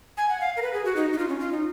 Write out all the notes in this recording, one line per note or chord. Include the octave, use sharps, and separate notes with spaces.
G#5
F#5
F5
A#4
B4
G#4
F#4
D#4
D#4
F4
C#4
F4
D#4